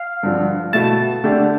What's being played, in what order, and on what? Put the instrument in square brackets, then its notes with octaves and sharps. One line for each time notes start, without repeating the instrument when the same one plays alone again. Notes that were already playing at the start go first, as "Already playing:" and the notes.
Already playing: [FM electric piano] F5
[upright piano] G2 D3 F3
[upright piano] B2 A3 E4 [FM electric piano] A5
[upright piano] D3 A3 D4 G4